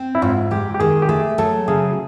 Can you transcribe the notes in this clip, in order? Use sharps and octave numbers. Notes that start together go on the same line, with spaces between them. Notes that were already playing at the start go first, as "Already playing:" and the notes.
Already playing: C4
E4
G#2 F4
G#3 G4
G4
D#3 G#4
G4
A3 G#4
F#3 A4
C#3 G#4